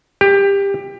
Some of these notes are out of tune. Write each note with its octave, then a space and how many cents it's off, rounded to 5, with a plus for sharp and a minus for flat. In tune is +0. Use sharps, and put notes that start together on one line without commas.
G4 +20